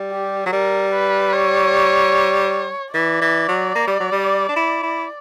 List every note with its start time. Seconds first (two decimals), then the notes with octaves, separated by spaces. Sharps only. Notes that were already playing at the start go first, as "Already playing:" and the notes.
Already playing: G3
0.12 G4
0.46 F#3
0.52 G3 A#4
0.93 B4
1.33 C#5
2.94 E3 D5
3.22 E3
3.48 F#3
3.75 A#3
3.87 G3
4.00 F#3
4.12 G3
4.49 D4
4.56 E4
4.83 E4